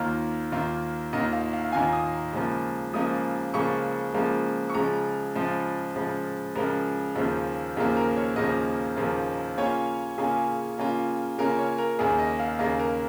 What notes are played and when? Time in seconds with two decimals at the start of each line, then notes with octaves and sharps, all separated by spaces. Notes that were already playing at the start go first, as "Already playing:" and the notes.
Already playing: D#2 D#3 A#3 F4 F6
0.52 D#2 D#3 A#3 F4
1.13 D#2 D#3 A#3 F4 D#5
1.33 F5
1.53 F5
1.65 F5
1.72 D#2 D#3 A#3 F4 G#5
1.93 D#6
2.33 C#2 C#3 F3 A#3
2.93 C#2 C#3 F3 A#3 D#6
3.54 C#2 C#3 F3 A#3 C#6
4.14 C#2 C#3 F3 A#3
4.69 C#6
4.74 C#2 C#3 F3 A#5
5.36 C#2 C#3 F3
5.96 C#2 C#3 F3
6.56 C#2 C#3 F3 A#4
7.15 D#2 C#3 F3 A#3
7.77 D#2 C#3 F3 A#3
7.97 A#4
8.16 C#5
8.36 D#2 C#3 F3 A#3 D#5
8.96 D#2 C#3 F3 A#3
9.57 C#3 A#3 C#4 F4 C#5
10.17 C#3 A#3 C#4 F4 G#4
10.78 C#3 A#3 C#4 F4
11.38 C#3 A#3 C#4 F4 A#4
11.59 C#5
11.78 A#4
11.99 D#2 C#3 A#3 G#4
12.19 D#5
12.40 F5
12.59 D#2 C#3 A#3 D#5
12.79 A#4